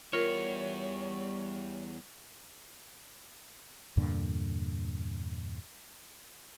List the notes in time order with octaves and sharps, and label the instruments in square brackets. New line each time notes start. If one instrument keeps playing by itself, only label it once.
[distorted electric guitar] E2 [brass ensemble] G3 [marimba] F4 A#4 [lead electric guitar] C#5
[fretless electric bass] E2 G2 A#2 D3